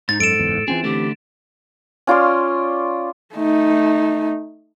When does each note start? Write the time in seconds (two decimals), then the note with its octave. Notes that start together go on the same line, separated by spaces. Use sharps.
0.09 G#2 D#4 A6
0.20 F#2 A4 D7 E7
0.39 F#1 E2
0.68 E3 C4 C#4 F4 G#4
0.84 D3 A3 G4
2.07 C#4 F4 D5 C6
3.35 A3 D#4